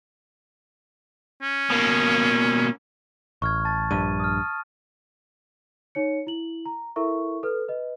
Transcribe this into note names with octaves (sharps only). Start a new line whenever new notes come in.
C#4
B2 A#3
A1 C#6 F6 G#6
A5 A6
A#1 G2 D#7
D#6 F6
D#4 C#5 C#7
E4 F#7
A#5
E4 A4 A#4 E5 C#6
A4 B4 F6
B4 D#5